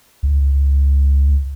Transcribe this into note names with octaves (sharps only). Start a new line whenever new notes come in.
C#2